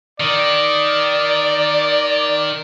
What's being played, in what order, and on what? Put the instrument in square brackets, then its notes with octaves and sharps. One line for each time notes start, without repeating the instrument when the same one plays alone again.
[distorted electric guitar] D#3 [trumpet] D5